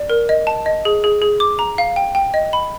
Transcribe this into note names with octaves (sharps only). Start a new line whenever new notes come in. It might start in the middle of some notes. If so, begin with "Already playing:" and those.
Already playing: D5
A#4
D#5
A5
D#5
G#4
G#4
G#4
D6
A#5
F5
G5
G5
D#5
B5